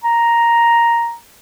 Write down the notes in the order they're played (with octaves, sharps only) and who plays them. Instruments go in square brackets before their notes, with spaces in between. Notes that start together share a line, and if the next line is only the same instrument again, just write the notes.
[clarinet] A#5